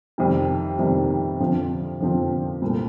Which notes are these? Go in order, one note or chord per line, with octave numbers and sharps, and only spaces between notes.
F2 C3 D#3 G3
F2 C3 D#3 G3
F2 D3 F3 C4
F2 D3 F3 C4
C2 A#2 A3